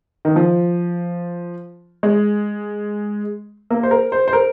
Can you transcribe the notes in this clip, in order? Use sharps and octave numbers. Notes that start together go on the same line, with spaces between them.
D#3
F3
G#3
A#3
C5
A#4
C5
C5
A#4